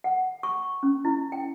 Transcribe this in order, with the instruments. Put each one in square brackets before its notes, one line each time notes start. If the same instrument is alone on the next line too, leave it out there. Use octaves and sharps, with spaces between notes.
[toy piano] F#5
C#6
C#4
E4
G5